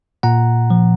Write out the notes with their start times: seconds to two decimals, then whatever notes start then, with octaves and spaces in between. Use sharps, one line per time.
0.23 A#2 F#5 A#5
0.70 F3